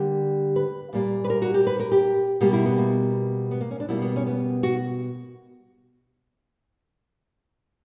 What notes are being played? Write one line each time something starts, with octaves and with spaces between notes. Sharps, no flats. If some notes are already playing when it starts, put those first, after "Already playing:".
Already playing: D3 G3 A#3 G4
B4
A#2 G3 A#3
B4
A#4
F#4
G4
B4
A#4
G4
B2 G3 A#3 G4
E4
B3
A#3
B3
A#3
C#4
D4
B2 G3 A#3 E4
B3
C#4
B3
F#4